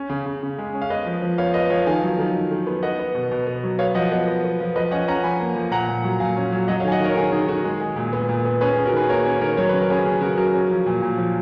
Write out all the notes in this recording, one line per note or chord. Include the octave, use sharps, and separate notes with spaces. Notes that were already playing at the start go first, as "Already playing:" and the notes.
Already playing: C#4
C#3
C#3
C#3
G#3
C#4
F5
B3 B4 D#5
F3
F3
B3 C#5 F5
B3 B4 D#5
F3 C#5 F5
D#3 F5 G#5
F#3
D#3
D#3
D#3
B3
B3 D#5 F#5
B3
B2
B2
B3
F#3
B3 C#5 F5
F3 D#5 F#5
B3 D#5 F#5
B3
B3
F3
F3 B4 D#5
C#4 D#5 F#5
C#4 F#5 A#5
F3 G#5 B5
A#3
F3
A#2 F#5 A#5
A#2
F#3
A#2 F5 G#5
C#4
F#3
F#3 D#5 F#5
C#5 F5
D#3 G#5
D#5 F#5
D#3 A#4 C#5
A#4
D#3 G#4
D#3 G#4
D#3 F#4
G#3
G#3
A#2
B3
A#2
B3
C#4 G#4 B4
G#4
C#4
F#4 A#4
D#3 G#4 B4
A#3 A#4 C#5
C#4 A#4 C#5
D#3 A#4 C#5
F#3 C#5
C#3 B4
A#4
C#4 G#4 B4
C#3 G#4
C#3 F#4 A#4
F#3 F#4 A#4
C#4
F3
A#2
A#2
F3